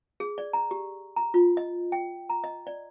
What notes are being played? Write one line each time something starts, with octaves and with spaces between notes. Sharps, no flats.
G#4
D5
A#5
G4
A#5
F4
D#5
G5
A#5
D#5
D5